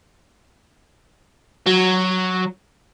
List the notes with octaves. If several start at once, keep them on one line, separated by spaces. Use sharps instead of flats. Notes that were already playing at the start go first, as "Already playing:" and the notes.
F#3